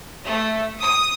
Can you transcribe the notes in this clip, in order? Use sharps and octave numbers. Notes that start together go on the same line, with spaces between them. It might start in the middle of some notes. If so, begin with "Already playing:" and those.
A3
D#6